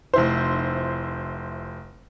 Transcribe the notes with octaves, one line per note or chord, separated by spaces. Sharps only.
F1 E4 C5